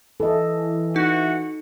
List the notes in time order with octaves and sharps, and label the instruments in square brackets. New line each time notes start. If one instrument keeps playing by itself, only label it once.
[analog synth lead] E3 [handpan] A4 D#5
[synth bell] D#4 [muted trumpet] F#4